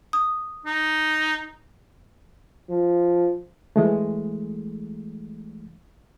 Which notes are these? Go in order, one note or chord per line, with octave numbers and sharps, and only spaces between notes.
D#6
D#4
F3
E3 G#3 A3